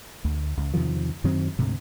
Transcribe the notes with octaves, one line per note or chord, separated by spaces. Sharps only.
D2
C#2
E2 C3 D#3 F3
F#2 D#3 F#3 C4
D2 G#2 C3